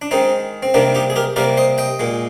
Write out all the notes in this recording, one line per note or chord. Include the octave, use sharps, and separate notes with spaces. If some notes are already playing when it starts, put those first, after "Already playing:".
D4
D#3 G#3 C4 D#4
C4
C3 D#3 G3 A#3 D4
D#4 G4
G#4
G4 A#4
C3 G3 A#3 A#4 D5
C5 D#5
D#5 G5
A#2 G#3